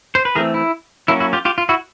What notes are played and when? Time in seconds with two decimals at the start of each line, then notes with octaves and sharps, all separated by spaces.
0.15 C5
0.25 B4
0.35 E3 A3 C4 G#4 A#4
0.54 E4
1.08 F#3 A#3 C#4 E4
1.20 E4 F#4
1.33 F4 G4
1.45 F4 G4
1.58 F4
1.69 E4 F#4